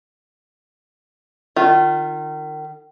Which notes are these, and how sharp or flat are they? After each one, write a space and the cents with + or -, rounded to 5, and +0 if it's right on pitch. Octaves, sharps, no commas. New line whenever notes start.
D#3 -30 F4 +0